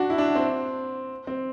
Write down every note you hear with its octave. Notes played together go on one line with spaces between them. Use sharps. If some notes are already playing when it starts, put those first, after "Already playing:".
Already playing: D4 F#4
E4
D4
C4
C4